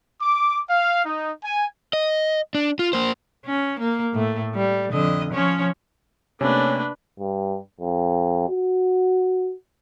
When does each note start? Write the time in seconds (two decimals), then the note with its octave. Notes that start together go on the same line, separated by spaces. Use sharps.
0.20 D6
0.69 F5
1.05 D#4
1.43 G#5
1.93 D#5
2.55 D4
2.79 F4
2.93 A#3 C5
3.45 C#4
3.79 A#3
4.13 A2 A3
4.55 G3
4.92 F2 D3 D#5
5.33 F3 C#4 C#5
6.41 C3 A3 A#3 C#4 D4 B4
7.19 G2
7.80 F2
8.49 F#4